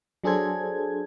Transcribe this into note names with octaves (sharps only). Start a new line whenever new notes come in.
F#3 D4 G#4 A4 C5 G#6